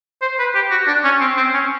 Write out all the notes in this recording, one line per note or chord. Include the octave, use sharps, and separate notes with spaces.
C5
B4
G4
F#4
D4
C#4
C4
C4
C#4